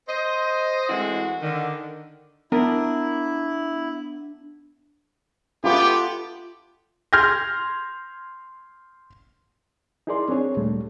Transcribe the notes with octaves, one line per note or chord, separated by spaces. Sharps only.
C5 D#5
E3 G#3 A3 C4 E4 F#4
D3 D#3
B3 D4 E4 A#4
B3 F4 G4 A4 D6
C6 F6 G6 G#6 A#6
D#4 E4 G#4 A#4 D5 C6
C4 D4 G#4 C#5
D2 A#2 G3 A3